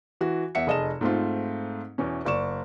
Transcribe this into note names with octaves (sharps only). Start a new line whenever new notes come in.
E3 F#4
E2 E5 F#5 C#7
F1 G#4 D#5 A5 E7
G#2 A3 C4 F4
E2 B2 E3 C#4
F#1 D5 C#6 E7